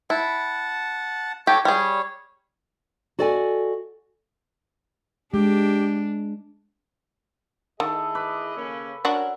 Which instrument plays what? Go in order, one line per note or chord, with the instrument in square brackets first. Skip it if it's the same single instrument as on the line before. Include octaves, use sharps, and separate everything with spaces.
[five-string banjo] E4 [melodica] F#5 A5
[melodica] F#4 A4 C#5 [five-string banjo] G4
[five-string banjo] G3 G#4 [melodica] C#5
[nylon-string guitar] F#4 A4 D5 D#5 G5 G#5
[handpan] G#3 [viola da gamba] D4 [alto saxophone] G4
[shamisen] D#3 [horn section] E4 G#4 D#5 [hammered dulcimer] A4
[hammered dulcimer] B4 B5 D6
[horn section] C#3 A#3 C#4
[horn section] C#4 A#4 [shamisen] D4 F#4